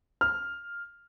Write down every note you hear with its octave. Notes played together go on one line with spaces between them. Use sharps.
F6